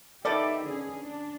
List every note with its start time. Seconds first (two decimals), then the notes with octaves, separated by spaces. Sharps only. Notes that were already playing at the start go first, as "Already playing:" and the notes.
0.25 D#3 B3 D#4 G4 A4 D5 E5
0.67 D3 C#4 G#4
1.04 D4